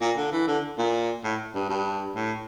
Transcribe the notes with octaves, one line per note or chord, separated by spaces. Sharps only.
A#2
D3
E3
D3
A#2
A2
G2
G2
A2